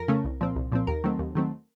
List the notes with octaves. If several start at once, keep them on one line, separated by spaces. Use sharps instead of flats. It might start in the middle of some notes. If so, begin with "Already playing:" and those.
Already playing: F2 A#4
C#3 A3 C#4
C2
A#2 F3 C4
C2
A#2 F3 C4
D#2 A#4
D#3 F#3 A3 C4
D#2
D#3 F#3 A3 C4